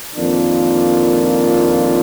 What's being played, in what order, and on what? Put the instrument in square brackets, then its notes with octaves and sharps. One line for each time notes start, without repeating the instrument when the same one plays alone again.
[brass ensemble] F2 D#3 A#3 D4 F4